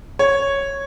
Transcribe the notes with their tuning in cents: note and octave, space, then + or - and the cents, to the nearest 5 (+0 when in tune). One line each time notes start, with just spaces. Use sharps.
C#5 -5